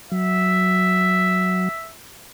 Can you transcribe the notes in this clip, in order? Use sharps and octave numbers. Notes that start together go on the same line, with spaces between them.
F#3 E5